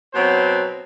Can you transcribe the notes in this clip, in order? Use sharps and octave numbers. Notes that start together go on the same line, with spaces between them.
B2 F#3 C4 C5